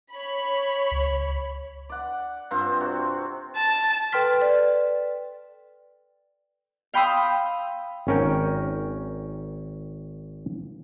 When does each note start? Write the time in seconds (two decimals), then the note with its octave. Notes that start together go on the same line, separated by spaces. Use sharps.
0.11 C#5 B5
0.92 C#2
1.89 D5 F#5
2.51 G2 C4 F4 C5
2.80 C3 F#4
3.56 A5
4.12 A4 B4 G5 C6 F6 B6
4.42 D5
6.94 F5 G5 B5 C6 D#6 E6
8.07 G#1 C#4 A#4 G5